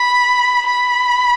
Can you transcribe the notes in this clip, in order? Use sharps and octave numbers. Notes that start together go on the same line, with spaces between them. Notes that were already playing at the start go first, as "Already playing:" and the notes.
Already playing: B5
B5